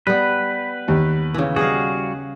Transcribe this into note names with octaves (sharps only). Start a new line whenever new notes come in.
G3 B3 B4
D#2
C#3 E3
G3 F#4 G#4 D#5 F5